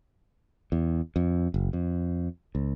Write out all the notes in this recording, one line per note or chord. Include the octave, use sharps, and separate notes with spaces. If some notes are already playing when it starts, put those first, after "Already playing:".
E2
F2
F#1
F2
C#2